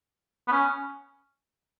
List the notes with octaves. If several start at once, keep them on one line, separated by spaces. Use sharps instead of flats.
B3
C#4